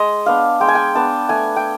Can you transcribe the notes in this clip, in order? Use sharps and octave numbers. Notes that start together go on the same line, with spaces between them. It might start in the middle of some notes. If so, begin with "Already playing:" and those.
Already playing: G#3 D#5
B3 D4 F5
G#3 G5
G#5
G5
B3 D4 A5
A3 G#5
G5